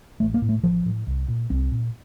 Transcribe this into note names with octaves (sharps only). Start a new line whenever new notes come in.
A1 A3
A#3
A2
A3
A1 F3
A2
C2
A#2
C2 C4
A#2